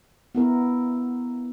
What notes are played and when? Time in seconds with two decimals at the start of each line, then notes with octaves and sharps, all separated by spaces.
0.35 B3 E4 A#4